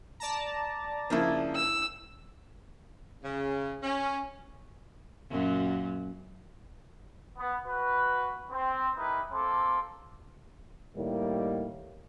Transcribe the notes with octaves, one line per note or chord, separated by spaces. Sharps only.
D5 A5 A#5
C#3 F3 A#3 D4 E4
E6
C#3
C#4
F#2 A#2 F#3
B3
F#4 B4
C4
D#4 E4 G4 A#4 B4
A#3 C4 A4 C6 D6
A2 D#3 G3 A#3